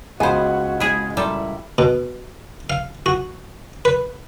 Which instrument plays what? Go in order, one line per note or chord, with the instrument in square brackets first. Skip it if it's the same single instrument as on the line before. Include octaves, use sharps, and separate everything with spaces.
[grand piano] C#2 B5 [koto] B3 C5 [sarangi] F#4 [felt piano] D#5 G#5
[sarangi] G#3 [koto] E4 G#4
[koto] A#2 G3 A4 [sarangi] E4
[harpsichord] B2
F5
F#4
B4